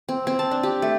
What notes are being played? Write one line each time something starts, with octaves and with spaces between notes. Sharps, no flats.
C4
C4
A5
D4
G4
A3